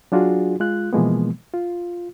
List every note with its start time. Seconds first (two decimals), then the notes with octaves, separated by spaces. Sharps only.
0.12 F#3 D4 F4 F#4 G#4
0.60 G#3 F4 F#6
0.93 B2 E3 F3 G#3 A#3 B3
1.54 F4